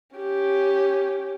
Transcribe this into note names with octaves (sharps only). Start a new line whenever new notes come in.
C#4 G4